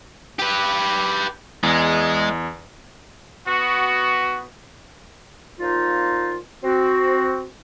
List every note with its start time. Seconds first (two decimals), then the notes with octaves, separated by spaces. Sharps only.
0.39 G4 B4
1.63 E2 G#3
3.48 B3 F#4
5.60 A#2 F3 D#4 F4
6.63 C4 F#4